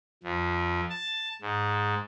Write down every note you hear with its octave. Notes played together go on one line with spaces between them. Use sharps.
F2
A5
G#2